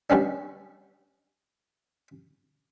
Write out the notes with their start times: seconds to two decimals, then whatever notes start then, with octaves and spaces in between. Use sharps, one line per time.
0.10 G3 B3 C#4 D4